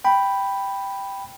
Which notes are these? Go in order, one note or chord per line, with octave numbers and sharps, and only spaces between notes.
G5 B5